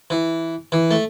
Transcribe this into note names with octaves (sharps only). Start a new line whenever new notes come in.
E3
E3
A3